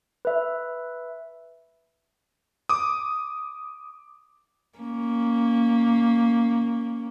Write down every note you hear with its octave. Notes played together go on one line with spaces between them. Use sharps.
B4 E5
D6 D#6
A#3 C#4